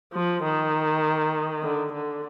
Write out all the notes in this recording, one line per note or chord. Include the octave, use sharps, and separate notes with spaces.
F3
D#3
D3
D3